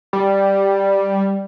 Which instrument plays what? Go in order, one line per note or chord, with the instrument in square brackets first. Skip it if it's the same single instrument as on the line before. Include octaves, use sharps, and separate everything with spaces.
[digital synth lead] G3